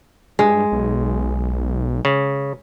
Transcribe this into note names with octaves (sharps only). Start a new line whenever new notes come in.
G2 G#3
B1
C#3